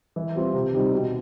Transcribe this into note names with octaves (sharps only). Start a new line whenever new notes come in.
E3
G3 C4 F4
C3
D#3 G3 C4 D#4
B2